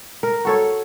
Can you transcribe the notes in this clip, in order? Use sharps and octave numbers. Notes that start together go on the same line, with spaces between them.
A#4
F#4 A4 C#5